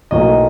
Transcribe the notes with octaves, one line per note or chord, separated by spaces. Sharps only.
B1 A2 F#3 A#3 D#5